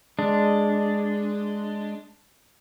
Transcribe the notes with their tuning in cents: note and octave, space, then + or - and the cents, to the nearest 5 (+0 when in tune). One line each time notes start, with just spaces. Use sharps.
G#3 +0 D4 +0